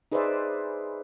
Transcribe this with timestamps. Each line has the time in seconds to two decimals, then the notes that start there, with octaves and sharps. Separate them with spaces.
0.12 D#4 G#4 B4 C5 D5 E5